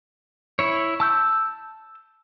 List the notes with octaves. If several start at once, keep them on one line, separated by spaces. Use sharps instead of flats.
E4 C#5
A5 E6 G6